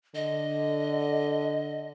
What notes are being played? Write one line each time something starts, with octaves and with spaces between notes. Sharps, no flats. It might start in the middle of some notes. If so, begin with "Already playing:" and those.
D3 D#5